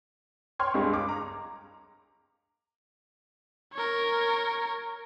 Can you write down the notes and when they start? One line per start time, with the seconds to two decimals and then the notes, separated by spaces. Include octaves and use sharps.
0.59 C#5 G5 C6 C#6 F6 G#6
0.74 C#2 G2 G#3
0.94 D6
1.09 A#5
3.74 A#4 C#5